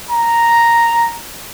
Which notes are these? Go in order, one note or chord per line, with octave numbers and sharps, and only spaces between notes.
A#5